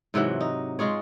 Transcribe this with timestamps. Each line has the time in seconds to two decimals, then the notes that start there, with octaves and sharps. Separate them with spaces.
0.14 G#2 C3 E3 F#3
0.41 D#4
0.79 G#3 F4 G#4 C#5